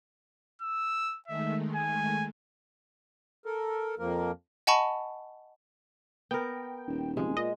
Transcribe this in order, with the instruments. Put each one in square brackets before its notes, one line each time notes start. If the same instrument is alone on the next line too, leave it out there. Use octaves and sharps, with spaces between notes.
[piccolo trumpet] E6
[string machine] D#3 G#3 A3 [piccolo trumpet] E5
[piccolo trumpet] G#5
[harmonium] A4 A#4
F2 F3 A#3 A#4
[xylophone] D#5 F#5 G#5 A5 B5 C#6
[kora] B3 A#4 [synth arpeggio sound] G5
[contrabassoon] D#1
[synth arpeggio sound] C3 F3 [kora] G#3
[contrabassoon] A#2 [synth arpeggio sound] D#5